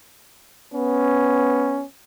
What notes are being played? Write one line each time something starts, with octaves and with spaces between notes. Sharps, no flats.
B3 C#4